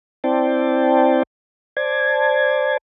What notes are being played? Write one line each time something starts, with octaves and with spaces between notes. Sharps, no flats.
C4 E4 C5 D5 G5 A5
C5 D5 A5 G#6